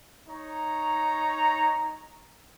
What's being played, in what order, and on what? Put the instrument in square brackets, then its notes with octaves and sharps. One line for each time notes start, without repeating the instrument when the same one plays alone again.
[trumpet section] D#4 C#5 A#5